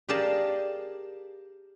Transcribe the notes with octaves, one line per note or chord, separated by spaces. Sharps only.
G4 G#4 A#4 D5 F5 A5